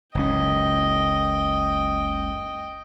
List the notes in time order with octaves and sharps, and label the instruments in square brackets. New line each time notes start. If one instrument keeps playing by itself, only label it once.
[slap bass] F#1 C#2 C#4 [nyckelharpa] D#5 G5